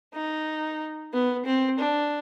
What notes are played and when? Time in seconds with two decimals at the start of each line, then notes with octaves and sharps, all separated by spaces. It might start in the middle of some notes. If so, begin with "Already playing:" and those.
0.14 D#4
1.13 B3
1.45 C4
1.79 D4